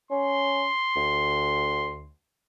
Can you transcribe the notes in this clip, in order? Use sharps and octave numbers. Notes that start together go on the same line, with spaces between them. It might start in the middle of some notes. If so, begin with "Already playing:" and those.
C#4 C6
D2